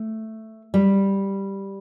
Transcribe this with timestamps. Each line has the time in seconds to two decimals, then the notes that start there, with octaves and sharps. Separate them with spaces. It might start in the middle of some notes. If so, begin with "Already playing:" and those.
Already playing: A3
0.74 G3